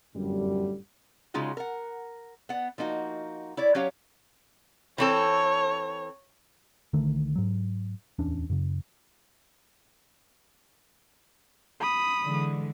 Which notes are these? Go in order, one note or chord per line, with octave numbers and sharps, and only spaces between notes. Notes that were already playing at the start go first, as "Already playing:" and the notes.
G1 F#2 A2 D3 G3
C#3 G#3 C#4 D#4 F4 F#4
A#4 F#5
B3 F#5
F3 A#3 D#4 F#4
E4 C#5 D5
F#3 C#4 G4 C#5 F5
E3 C4 A4 C#5
B1 D3 D#3 A3
G#2 F#3
D1 E2 C#4 D4
F#2 C#3
B5 D#6
D3 E3 G#3